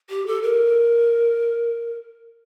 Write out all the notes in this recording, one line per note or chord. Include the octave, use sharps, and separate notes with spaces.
G4
A4
A#4